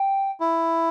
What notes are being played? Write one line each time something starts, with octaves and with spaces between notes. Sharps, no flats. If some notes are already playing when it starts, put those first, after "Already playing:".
Already playing: G5
E4